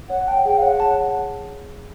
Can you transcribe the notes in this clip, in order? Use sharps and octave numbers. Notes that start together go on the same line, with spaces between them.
C#5 F#5
G5 A5
G#4 G5
F5
C#5 F#5
A5